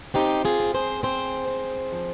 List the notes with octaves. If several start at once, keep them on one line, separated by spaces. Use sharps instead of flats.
C4 D#4 G4
F4 G#4
C4
G#4 C5
C4 G#4 C5
C4
F3